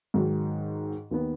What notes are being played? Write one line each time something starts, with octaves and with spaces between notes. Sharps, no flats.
G#2 D#3 F#3
D#2 D#3 B3